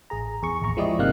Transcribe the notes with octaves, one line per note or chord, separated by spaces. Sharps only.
A1 G#4 A#5
E2 G#4 C#6
A1 D#2 A#5 C#6
F3 G#3 E4 G4 D5 D#5
G1 C3 A#3 D#4 F5 F#6